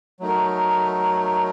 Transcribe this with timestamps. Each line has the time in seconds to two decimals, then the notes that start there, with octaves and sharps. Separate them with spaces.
0.20 F#3 A3 D#4 A#4